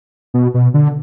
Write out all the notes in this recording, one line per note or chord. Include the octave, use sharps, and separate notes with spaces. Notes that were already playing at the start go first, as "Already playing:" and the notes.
B2
B2
D3